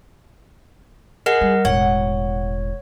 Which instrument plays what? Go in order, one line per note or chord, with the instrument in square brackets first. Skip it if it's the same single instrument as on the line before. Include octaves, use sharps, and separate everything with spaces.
[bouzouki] G#4 [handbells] A#4 D#5 F#5
[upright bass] G3
[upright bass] E1 A2 [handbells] C#5 [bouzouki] F#5